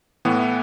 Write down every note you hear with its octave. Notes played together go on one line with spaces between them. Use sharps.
A2 E3 B3